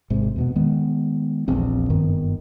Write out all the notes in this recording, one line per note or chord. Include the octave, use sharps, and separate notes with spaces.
G#1 G#2 C3
E2 B2 B3
D#3 G#3 B3
D#1 A#1 E2 C4
F#1 G2 D#3 B3